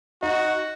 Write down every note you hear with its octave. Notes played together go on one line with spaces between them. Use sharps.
D#4 F#4